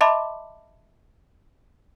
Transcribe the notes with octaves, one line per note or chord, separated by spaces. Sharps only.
D#5 E5 A5 B5 C6 D6